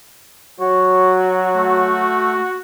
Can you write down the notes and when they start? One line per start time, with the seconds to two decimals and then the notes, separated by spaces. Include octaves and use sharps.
0.60 F#3 F#4 C#5
1.57 A3